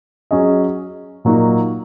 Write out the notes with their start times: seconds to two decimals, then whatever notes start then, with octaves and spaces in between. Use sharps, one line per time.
0.31 F#3 C#4 G#4 D#5
1.25 A#2 F#3 A#3 D#4 F#4